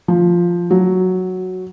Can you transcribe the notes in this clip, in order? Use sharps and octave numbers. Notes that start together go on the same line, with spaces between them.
F3
F#3